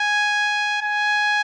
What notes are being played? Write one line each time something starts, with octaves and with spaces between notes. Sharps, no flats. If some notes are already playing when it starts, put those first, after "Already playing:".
Already playing: G#5
G#5